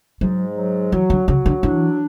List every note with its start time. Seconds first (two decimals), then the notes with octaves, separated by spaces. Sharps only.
0.21 G#2 F#3
0.57 F#3
0.92 E3 F#3
1.10 D3
1.28 C#3 F#3
1.46 D3
1.63 E3 D4